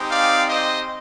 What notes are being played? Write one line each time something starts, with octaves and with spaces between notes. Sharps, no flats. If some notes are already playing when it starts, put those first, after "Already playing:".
Already playing: G#3 C4 D#4 G4
D5 F5
C5 D#5